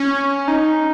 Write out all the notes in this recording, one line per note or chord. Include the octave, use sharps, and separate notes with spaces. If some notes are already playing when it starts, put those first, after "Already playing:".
Already playing: C#4
D#4